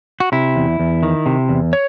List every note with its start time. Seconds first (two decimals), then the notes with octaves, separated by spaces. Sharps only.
0.20 F#4
0.32 C3 E4
0.56 E2
0.80 E2
1.03 D#3
1.26 C3
1.49 E2
1.73 C#5